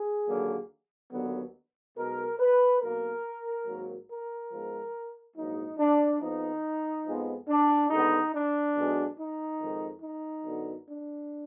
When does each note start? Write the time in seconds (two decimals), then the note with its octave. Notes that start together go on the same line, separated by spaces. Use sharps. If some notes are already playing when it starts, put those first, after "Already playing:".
Already playing: G#4
0.28 D#2 D3 F#3 A#3
1.12 D#2 D3 F#3 B3
1.97 B1 B2 G#3 A#4
2.40 B4
2.82 B1 B2 A#3 A#4
3.66 G#1 G#2 F#3 A#3
4.09 A#4
4.51 G#2 F3 G#3 B3
5.36 A#1 G#2 F#3 A#3 D#4
5.79 D4
6.21 F2 F3 B3 D#4
7.05 F2 F3 G#3 B3
7.48 D4
7.90 D#2 D3 G#3 B3 D#4
8.33 D4
8.75 B1 B2 G#3 B3
9.17 D#4
9.60 F2 D#3 G#3
10.02 D#4
10.45 F#2 D3 F#3 B3
10.87 D4